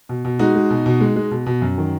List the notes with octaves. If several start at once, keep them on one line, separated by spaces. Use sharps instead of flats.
B2
B2
G#3 D#4 F#4
G#3
B2
B2
G#3
G#3
B2
B2
F#2
D#3